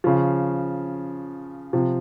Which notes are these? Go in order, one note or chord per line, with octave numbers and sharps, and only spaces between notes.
C#3 F3
C3 F3